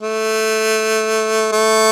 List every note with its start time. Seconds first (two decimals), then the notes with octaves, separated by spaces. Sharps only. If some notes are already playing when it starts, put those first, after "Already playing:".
0.02 A3
1.52 A3